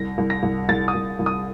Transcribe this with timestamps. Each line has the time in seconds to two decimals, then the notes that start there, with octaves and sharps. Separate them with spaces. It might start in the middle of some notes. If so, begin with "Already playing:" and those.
Already playing: C2 A#6
0.18 C2
0.30 A#6
0.43 C2
0.69 C2 A6
0.88 D#6
0.94 C2
1.19 C2
1.26 D#6